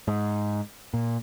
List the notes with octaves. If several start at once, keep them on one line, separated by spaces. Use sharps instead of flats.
G#2
A#2